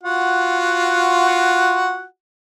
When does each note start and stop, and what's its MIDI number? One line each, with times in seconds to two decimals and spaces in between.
0.03 2.04 65
0.03 2.04 66
0.03 2.04 78